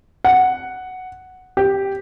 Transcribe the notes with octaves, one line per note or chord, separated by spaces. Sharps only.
F#5
G4